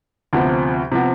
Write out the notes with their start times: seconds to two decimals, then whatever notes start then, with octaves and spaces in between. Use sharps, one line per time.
0.33 D2 C3 F3 B3
0.92 C3 F3 B3